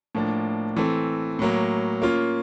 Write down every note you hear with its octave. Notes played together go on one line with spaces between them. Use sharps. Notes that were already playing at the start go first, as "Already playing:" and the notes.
A2 F3 A#3 D4
E3 A3 C4
A2 F#3 A#3
A#3 C#4 F4